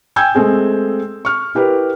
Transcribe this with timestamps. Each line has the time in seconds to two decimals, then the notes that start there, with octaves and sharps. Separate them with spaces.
0.16 G5 G#5 E6 G6 G#6
0.35 G#3 A3 C4 G#4
1.25 C#6 F6
1.55 E4 G4 A#4 B4